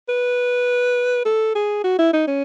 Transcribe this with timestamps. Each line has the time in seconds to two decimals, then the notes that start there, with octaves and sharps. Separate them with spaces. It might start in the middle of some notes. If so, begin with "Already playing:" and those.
0.09 B4
1.25 A4
1.55 G#4
1.84 F#4
1.99 E4
2.13 D#4
2.27 C#4